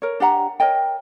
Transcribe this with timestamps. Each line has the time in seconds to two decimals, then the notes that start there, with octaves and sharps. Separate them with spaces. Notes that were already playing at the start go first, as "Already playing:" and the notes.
0.02 A#4 C#5
0.20 D4 G4 F#5 A#5
0.60 A#4 C#5 D#5 G5